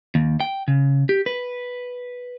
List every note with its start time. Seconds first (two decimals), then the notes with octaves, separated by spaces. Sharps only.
0.15 D#2
0.40 G5
0.68 C#3
1.09 G4
1.26 B4